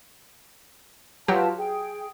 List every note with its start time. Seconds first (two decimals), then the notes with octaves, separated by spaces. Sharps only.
1.28 F#3 F4 G4 B4 A5
1.57 G#4 G5